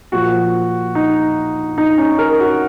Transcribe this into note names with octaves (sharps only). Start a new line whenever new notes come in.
A#2 F3 F#4
D#4
D#4
C#4
A#4
F#4